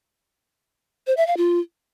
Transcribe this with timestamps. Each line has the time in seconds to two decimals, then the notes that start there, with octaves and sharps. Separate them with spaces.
1.07 C5
1.17 E5
1.27 F5
1.37 F4